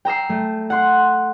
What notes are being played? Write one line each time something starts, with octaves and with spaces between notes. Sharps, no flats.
G5 A#5 E6 C7
A3
F#5 C6